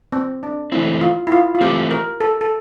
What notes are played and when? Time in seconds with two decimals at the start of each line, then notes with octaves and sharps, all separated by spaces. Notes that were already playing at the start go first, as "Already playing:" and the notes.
0.12 C4
0.43 D4
0.72 E3 A3 C4 E4
1.01 F4
1.27 E4
1.32 F4
1.55 F4
1.61 E3 A3 C4 G4
1.91 A#4
2.20 A4
2.41 A4